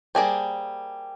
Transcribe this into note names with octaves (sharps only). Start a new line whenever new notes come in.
G3 A#3 D#4 G#4 C5 G5